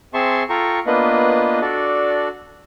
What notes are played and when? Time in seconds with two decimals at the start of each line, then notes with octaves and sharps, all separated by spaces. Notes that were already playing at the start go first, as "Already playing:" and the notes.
0.14 C4 G#4 E5 A5 C6 C#6
0.50 F4 A4 G5 A#5 C#6
0.87 A#3 B3 D4 F4 B4 D#5
1.62 D4 F#4 A4 D5